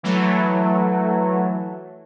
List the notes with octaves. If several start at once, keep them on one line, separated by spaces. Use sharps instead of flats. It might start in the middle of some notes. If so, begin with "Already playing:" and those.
E3 F#3 A3